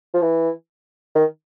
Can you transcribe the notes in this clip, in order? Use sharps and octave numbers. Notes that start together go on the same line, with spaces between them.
F3
E3
D#3